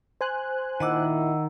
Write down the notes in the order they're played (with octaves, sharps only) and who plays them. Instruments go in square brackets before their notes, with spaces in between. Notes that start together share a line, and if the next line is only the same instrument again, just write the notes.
[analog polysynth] C5 G#5 F#6
[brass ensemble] A#2 E4 [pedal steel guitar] D#3 D6 [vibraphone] D#5 F#5 E6